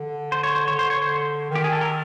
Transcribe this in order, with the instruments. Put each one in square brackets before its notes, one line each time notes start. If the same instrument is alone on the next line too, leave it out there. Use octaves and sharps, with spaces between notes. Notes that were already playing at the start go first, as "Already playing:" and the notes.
Already playing: [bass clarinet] D3
[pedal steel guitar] C5
C#5
C5
[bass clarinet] D3 [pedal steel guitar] C#5
[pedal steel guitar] C5
C#5
C5
[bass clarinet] D#3 [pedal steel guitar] G4
[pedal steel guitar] G#4
A4
A#4